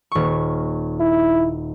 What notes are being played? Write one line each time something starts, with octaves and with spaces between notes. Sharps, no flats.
D#1 C#6
E4